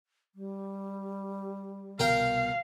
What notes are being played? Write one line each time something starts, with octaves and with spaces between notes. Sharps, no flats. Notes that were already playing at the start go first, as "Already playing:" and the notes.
G3
C2 B2 A#4 F5 G5